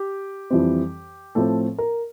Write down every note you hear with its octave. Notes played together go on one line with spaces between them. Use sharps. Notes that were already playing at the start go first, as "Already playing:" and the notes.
Already playing: G4
F2 E3 G3 C4
A2 F3 A3 C4 A4
A#4